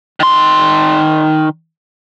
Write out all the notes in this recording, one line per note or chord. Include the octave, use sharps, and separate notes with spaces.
D#3 C6